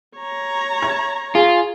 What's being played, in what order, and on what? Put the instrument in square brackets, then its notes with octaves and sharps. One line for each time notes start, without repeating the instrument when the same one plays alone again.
[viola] C#5 A#5
[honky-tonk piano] G#6
[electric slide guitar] F4 [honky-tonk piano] G#4